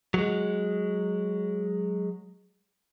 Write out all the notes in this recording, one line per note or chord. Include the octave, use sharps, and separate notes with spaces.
F#3 G#3